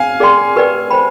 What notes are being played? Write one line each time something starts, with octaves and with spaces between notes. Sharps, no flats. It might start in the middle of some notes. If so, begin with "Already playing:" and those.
Already playing: F5 G#5
G#4 D5 G5 C6
G4 B4 D5 G5
C5 G5 B5